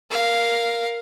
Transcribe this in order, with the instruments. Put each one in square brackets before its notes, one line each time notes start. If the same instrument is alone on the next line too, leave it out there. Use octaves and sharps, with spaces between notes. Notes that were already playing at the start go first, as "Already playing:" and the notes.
[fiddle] A#4 F5